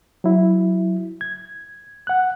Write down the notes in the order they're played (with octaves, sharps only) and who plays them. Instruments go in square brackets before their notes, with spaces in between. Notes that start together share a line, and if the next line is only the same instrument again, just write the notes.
[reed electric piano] F#3 E4
G#6
F#5 F#6